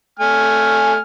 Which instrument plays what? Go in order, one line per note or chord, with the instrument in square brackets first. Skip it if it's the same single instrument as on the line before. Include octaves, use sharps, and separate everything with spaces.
[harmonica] A3 G#5 F6